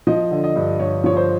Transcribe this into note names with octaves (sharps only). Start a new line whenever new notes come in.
F3 D#5
D3
D#5
G2
G2 C#5
F3 C#5
C5